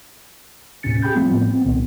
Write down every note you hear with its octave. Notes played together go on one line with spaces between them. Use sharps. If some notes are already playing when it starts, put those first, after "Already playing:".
D#2 A2 C3 C#4 A6 C#7
G4 G#4 G5 B5 G6
F3 G3 A3 B3 C4 F4
A2
B3 C4
C2 A#2 D#3